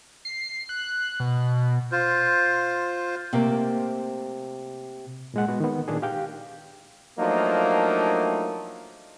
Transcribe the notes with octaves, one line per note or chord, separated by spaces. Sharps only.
C7
F#6
B2
F4 C5
C3 A3 A#3 C4
A#2 G#3 F#5
G#3 B3 F#4
D#3 B3
A#2 D#3 D4 G#4
G4 F5 G5
F3 F#3 A3 A#3 D4 D#4